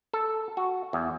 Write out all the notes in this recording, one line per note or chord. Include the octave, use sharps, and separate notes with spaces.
A4
F#4
E2